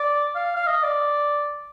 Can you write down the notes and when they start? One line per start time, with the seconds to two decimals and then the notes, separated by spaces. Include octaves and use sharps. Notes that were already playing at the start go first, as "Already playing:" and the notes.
Already playing: D5
0.35 F5
0.56 F5
0.67 D#5
0.83 D5